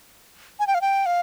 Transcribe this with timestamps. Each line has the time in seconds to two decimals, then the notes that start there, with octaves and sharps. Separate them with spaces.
0.59 G#5
0.67 G5
0.75 F5
0.81 G5
1.06 F5